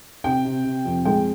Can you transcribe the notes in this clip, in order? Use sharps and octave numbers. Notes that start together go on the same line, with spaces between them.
C3 G5
C3
C3
F2
G#3 G5